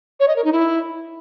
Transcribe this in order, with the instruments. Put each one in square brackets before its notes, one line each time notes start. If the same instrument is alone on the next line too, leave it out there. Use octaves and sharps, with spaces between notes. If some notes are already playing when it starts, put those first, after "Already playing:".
[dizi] C#5
D#5
A#4
D#4
E4